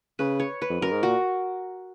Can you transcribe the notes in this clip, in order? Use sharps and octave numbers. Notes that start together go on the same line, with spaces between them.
C#3 B4
C#5
B4
F2
F#2 A#4
G#2
A#2 F#4